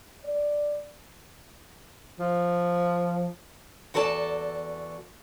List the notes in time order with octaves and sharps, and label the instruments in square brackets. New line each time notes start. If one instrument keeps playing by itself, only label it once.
[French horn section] D5
[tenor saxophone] F3
[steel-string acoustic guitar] E2 F#4 A4 D5 A5